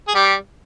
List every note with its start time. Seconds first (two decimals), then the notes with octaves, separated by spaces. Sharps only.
0.08 G#4
0.15 G3 G4